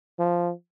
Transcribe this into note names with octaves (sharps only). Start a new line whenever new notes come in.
F3